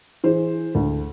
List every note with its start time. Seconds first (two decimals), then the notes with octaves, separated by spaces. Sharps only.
0.24 E3 G#4 C5
0.75 D2